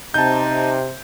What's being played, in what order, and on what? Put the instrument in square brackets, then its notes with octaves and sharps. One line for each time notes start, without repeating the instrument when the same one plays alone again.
[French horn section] C3 [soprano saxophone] D#4 [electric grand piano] A5 G6